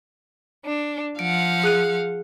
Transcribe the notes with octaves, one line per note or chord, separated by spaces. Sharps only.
D4
F3 F5 F#5 D7
G#4 F#6 D#7